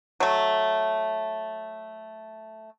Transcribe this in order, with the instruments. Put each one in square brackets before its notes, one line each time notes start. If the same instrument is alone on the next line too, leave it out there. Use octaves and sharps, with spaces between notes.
[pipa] F#3 A3